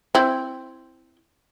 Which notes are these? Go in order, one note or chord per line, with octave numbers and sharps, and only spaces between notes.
C4 E4